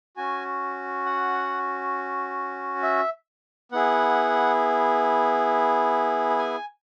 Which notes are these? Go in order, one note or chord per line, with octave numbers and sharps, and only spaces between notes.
C#4 F#4 G#5
F#5
E5
B3 E4 G#4 F#5
G#5